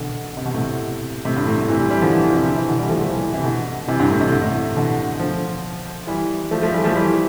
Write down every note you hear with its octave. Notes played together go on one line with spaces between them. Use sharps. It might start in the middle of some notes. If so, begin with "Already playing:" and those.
Already playing: B2 D3
C3
B2
A2 C3
A2 C3
G2
A2
C3 E3
E3 G3
E3 G3
D3 F3
E3
F3
C3 E3
D3
C3 E3
B2 D3
E3 G3
F3 A3
F3 A3
E3 G3
C3 E3
B2 D3
C3 E3
G2
A2
C3
D3
A2 C3
B2 D3
D3 F3
E3 G3
F3 A3
F3 A3
E3 G3
F3 A3
E3 G3